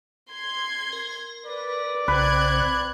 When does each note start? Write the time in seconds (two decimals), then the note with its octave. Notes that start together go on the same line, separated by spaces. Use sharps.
0.31 C6 G#6
0.93 A#4
1.46 B4 D5
2.08 B1 C#3 C4 B4 F#6 G#6